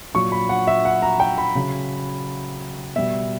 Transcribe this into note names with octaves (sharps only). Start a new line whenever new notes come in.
A#2 F#3 C#6
B5
F#5
E5
F#5
A#5
G5
B5
C#3 F#3
B2 G3 E5